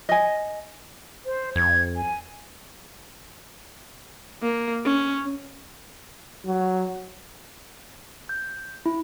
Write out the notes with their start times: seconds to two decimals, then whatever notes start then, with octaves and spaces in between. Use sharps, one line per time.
0.09 D#5 G#5
1.26 C5
1.56 F2 G#6
1.96 G#5
4.43 A#3
4.85 C#4
6.46 F#3
8.29 G6
8.86 E4